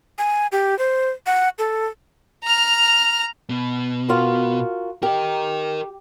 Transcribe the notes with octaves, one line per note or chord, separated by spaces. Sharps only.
G#5
G4
C5
F#5
A4
A#5 F6
B2
F4 F#4 A#4
G4 A#4 D#5